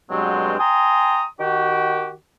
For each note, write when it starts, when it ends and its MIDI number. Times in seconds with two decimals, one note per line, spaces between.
0.10 0.54 43
0.10 0.54 47
0.10 0.54 54
0.10 0.54 56
0.10 0.54 60
0.59 1.23 79
0.59 1.23 80
0.59 1.23 82
0.59 1.23 84
0.59 1.23 87
1.40 2.12 51
1.40 2.12 66
1.40 2.12 67